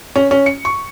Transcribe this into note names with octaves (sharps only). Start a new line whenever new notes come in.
C#4
C#4
C#7
C#6